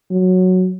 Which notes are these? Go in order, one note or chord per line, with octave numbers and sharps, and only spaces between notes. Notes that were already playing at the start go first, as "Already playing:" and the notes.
F#3